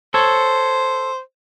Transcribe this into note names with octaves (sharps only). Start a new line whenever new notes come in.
A4 C5 C#5